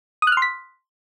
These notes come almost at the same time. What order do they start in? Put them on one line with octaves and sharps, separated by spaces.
D#6 F#6 F6 C6 B6